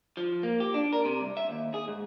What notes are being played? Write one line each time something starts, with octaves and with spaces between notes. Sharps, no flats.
F3
A#3
G4
D4
A#4
C3
C2
E5
D#2
G#4
G#2